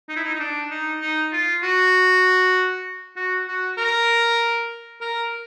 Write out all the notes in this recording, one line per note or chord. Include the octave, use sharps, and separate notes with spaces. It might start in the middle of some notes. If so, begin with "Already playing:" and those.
D#4
E4
D#4
D#4
D4
D#4
D#4
F4
F#4
F#4
F#4
A#4
A#4